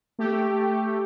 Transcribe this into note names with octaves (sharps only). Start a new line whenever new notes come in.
A3 G4